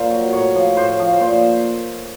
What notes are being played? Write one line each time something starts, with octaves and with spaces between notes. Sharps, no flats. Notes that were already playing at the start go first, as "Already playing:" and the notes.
Already playing: A#2 A#4 C5
F#3
A2 C#5
F3
A2 C5
F3
A#2 C5